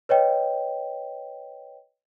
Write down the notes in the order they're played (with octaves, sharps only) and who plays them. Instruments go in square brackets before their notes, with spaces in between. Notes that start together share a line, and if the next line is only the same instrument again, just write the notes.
[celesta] B4 C#5 D#5 G5